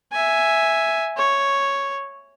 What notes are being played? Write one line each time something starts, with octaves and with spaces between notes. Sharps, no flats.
E5 G#5
C#5